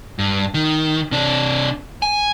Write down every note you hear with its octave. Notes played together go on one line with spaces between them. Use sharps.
G2
D#3
C3 D4
G#5